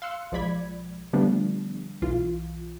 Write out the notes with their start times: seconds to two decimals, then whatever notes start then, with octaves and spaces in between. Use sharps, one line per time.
0.02 F5 C6 E6 F#6 C#7
0.32 B1 F3 G#3 D5 B5 G#6
1.13 D3 F3 G3 A3 B3 D4
2.02 B1 E3 F4